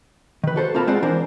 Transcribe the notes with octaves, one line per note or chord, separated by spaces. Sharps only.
D#3 B4
F#4 A4 C5
A#3 C4 F4 A#4 A5 B5
G#3 C4 F4 C5 D5 F#5
E3 D4 A#4 C5